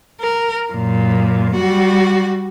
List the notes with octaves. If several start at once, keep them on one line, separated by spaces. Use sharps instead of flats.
A#4
F#2 A#2
G3 F#4